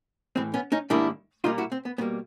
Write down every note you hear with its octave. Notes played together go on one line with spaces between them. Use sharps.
A2 E3 G#3 C4
B3 C#4
C#4 D#4
G#2 D#3 G3 A#3 D4 E4
A#2 G3 A#3 D#4 F4
E4 F#4
C4
B3
B2 G3 A#3 B3